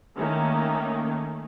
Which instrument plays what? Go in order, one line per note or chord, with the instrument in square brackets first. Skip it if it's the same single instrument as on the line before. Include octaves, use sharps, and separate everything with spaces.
[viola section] D#3 A3 A#3 C#4